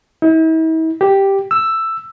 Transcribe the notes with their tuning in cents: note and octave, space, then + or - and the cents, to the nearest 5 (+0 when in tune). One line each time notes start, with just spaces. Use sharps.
E4 -45
G4 +0
E6 +5